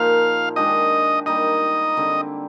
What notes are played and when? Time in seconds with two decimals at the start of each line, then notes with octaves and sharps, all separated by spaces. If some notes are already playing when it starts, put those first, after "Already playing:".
Already playing: A#2 F3 A#3 D#4 F4 G#4 F5
0.56 D#3 G#3 D4 G4 D#5
1.26 G3 A#3 D#4 D#5
1.97 D3 G3 C4